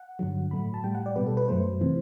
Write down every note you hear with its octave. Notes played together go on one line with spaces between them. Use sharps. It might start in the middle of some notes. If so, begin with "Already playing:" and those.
Already playing: F#5
G2 D3 F#3
A2 F#3 A3 B5
A5
A2 G3 G5
F#5
D5
B2 G3 B4
A4
B4
F#2 F#3 A3 C5
C3 E3